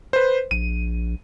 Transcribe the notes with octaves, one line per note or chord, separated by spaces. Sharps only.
B4 C5
A#1 D#7